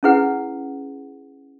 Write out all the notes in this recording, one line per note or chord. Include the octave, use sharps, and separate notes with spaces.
C#4 E4 G#4 B4 F#5